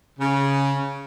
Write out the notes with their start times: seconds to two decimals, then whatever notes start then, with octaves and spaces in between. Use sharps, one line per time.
0.20 C#3